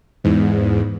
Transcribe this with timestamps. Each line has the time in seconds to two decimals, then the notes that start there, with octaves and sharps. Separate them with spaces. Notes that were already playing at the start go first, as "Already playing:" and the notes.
0.24 E2 G#2